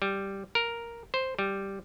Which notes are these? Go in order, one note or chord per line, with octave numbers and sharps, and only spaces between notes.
G3
A#4
C5
G3